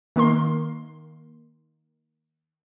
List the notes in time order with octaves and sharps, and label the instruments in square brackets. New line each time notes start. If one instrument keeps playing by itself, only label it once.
[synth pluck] D#3 A#3 A#4 C6